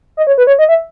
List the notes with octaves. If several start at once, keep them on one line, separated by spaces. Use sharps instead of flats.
D#5
C#5
B4
C#5
D#5
E5